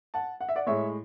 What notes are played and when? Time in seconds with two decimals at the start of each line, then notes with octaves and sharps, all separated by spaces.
0.14 F#5 A5
0.41 F#5
0.49 E5
0.56 D5 F#5
0.67 A2 G#3 C#5 E5